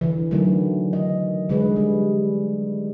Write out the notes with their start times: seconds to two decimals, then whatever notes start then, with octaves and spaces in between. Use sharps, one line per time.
0.01 D3 E3
0.31 D3 D#3 F#3 A3
0.93 D#5
1.49 D3 G#3 G#4 B4
1.76 G3